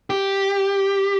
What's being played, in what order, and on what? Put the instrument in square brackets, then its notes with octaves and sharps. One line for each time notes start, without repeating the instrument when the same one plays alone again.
[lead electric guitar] G4